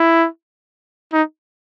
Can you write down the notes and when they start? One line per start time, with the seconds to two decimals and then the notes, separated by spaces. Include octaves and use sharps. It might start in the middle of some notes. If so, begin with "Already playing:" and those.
Already playing: E4
1.13 D#4